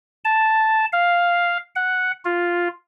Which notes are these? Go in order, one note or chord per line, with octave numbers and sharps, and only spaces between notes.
A5
F5
F#5
F4